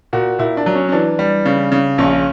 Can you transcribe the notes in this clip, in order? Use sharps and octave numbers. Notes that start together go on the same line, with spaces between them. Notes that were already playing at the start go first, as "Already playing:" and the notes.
A#2 F#4
A#2 E4
D4
F#3
C#4
C#4
E3 D4
G3
C#3
C#3
A#1 C#4